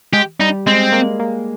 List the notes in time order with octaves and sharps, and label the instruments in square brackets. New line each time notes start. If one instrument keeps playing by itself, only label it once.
[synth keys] G#3 [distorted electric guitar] G4
[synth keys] G3 [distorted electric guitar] D#4
[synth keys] G#3 [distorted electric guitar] C4
[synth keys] A#3
A#3